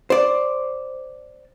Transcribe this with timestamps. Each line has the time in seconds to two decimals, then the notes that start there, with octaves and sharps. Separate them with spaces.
0.10 C5 D5